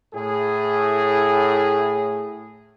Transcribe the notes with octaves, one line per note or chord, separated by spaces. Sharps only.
A2 G#4